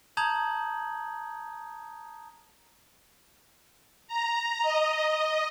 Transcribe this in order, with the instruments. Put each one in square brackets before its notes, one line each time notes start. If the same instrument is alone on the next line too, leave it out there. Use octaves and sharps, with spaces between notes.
[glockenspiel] A5 A#5 D#6 G6 G#6 F#7
[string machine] A#5
D#5
D#5